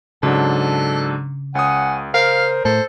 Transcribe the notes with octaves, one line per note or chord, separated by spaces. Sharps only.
G#2 C#3 F#3 D4 A4
C#2 C#4 F#5 D#6
A#4 C5 F5
A2 A4 C5